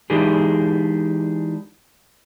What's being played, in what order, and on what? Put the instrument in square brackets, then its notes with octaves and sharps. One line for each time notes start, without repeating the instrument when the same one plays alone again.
[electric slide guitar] E3 G#3 D4 D#4 G4 G#4